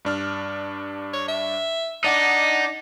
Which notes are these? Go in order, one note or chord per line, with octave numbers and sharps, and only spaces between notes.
G2 D4 F6
C#5
E5
D4 D#4 D#5 F#5 D6